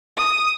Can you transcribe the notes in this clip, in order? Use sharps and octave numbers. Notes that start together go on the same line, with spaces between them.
D#6